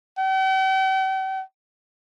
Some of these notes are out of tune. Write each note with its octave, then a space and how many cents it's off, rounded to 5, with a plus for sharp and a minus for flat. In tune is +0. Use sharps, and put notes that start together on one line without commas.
G5 -45